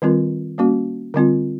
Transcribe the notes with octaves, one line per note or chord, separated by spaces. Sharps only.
D#3 G3 C4 F4 A#4
G3 A#3 C#4 F#4
D3 G3 C4 F4